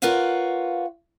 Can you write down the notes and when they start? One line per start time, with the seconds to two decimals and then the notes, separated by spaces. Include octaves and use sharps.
0.02 F4 A#4 B4 C#5 F5 F#5